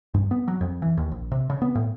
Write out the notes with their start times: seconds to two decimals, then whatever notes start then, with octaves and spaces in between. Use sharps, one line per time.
0.14 G2
0.31 B3
0.48 F#3
0.61 F2
0.82 E3
0.97 D#2
1.12 A#1
1.32 C3
1.50 C#3
1.62 B3
1.75 A2